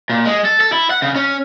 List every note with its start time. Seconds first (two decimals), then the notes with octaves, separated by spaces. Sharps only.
0.10 A#2
0.26 G#3
0.45 A4
0.60 A4
0.72 E4
0.90 F#5
1.02 C#3
1.16 C#4